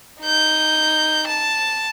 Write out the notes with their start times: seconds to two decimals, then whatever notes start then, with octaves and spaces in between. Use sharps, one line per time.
0.21 D#4 G6
1.27 A5